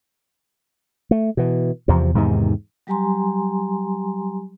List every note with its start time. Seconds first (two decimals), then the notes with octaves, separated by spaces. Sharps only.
1.11 A3
1.37 B2 E3
1.88 E2 C3 F3
2.14 E2 G#2 C3 D#3
2.87 F#3 G3 G4 G#5 A#5 C6